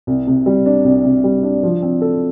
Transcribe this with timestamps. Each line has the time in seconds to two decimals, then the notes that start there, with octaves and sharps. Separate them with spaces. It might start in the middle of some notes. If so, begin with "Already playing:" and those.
0.07 C2
0.27 C3
0.46 G3
0.66 D4
0.84 C2
1.04 C3
1.24 G3
1.43 D4
1.63 F3
1.82 C4
2.01 A4